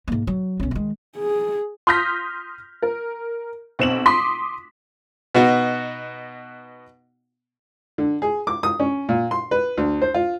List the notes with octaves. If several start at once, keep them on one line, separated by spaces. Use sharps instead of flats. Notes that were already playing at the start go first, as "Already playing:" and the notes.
G#2 A#3
F#3
B1 C#4
D#3 G#3
G#4
C6 D#6 F6 G6 A#6 B6
A#4
B1 C4 E7 F#7
C6 D6 D#6 B6
B2 B3 D#4 F#4
D3
G#4
D6
D#6
C#4
A#2
C6
B4
D2
C5
F4